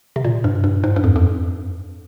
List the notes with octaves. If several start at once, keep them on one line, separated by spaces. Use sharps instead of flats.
C3
A#2
G2
G2
G#2
G2
F2
F2